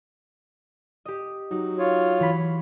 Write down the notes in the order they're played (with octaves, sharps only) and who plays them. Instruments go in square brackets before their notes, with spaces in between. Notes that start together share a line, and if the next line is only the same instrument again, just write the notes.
[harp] G4 D#5
[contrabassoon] F#3 [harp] D#4
[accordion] F4 C#5
[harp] E3 B5